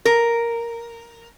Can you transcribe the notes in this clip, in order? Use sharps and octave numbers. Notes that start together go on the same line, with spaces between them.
A#4